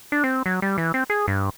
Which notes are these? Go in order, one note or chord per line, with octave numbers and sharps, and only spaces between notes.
D4
C4
F#3
G3
E3
C4
G#4
G2